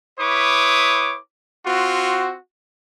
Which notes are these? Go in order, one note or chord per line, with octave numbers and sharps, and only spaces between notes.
E4 B4 C#5 D6 D#6
C4 F4 F#4